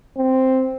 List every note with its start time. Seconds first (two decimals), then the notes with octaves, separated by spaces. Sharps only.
0.18 C4